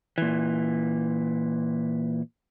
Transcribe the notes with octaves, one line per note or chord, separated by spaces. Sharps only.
A#2 E3